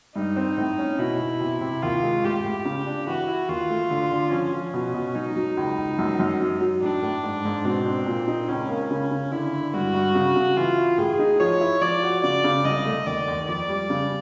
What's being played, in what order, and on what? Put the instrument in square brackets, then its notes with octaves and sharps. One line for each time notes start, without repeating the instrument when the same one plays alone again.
[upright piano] G2 [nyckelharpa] D#4
[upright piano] C4
A2
C#4
[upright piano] B2 [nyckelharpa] E4
[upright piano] B2
C3
C3
[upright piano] D#2 [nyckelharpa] F4
[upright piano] G#3
[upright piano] A2 [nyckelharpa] G4
[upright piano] A2
C#3
D4
[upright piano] E3 [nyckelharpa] F#4
[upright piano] E4
[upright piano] D#2 [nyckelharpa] F4
[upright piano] A3
D3
D3
[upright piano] F3 [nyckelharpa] C#4
[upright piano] F3
B2
B2
[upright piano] F#3 [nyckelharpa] D#4
[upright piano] F#3
C#2
C#2
F#2
F#2
F#3
F#3
[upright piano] A2 [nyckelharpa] D4
[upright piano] A2
G#2
G#2
[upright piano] B2 [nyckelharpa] C4
[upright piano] D4
A#2
D#4
[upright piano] C#2 [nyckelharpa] C#4
[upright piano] A#3
C#3
C#3
[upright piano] D3 [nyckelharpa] E4
[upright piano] D3
[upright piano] G2 [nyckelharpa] F#4
[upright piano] G2
C#3
C#3
[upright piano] E3 [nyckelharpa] F4
[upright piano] E4
[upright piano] A2 [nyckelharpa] G#4
[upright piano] D#4
[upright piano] F3 [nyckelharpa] C#5
[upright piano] E4
[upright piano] F3 [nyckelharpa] D5
[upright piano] F#4
[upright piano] C#3 [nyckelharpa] D5
[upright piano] C#3
[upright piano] C2 [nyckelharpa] D#5
[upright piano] A3
[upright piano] D#2 [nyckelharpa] D5
[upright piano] D#2
[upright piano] F2 [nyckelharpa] D5
[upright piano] G3
C#3